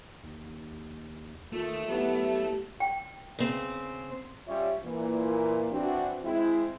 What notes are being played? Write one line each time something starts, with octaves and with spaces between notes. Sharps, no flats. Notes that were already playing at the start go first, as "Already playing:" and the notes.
D#2
D#3 A3 F4
F#3 B3 E4 G4
G5
C#3 C4
G3 C#4 F4 C#5 E5
A#2 E3
E3 C4 D4 F#4
G#3 C4 E4